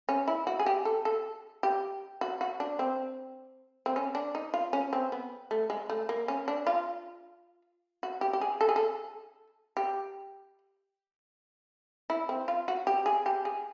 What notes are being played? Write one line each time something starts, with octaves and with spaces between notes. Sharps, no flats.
C#4
E4
F#4
G#4
G4
A4
A4
G4
F#4
F#4
D4
C4
C4
C#4
D4
D#4
F4
C#4
C4
B3
A3
G#3
A3
A#3
C#4
D4
F4
F#4
G4
G4
G#4
A4
G#4
A4
G4
E4
C4
F4
F#4
G4
G#4
G4
G#4